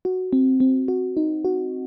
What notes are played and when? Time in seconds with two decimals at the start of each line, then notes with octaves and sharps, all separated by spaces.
0.05 F#4
0.33 C4
0.60 C4
0.88 F#4
1.17 D#4
1.45 F#4